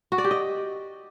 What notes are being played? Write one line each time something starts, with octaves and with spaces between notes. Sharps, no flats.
F#4
D5
G4
D#5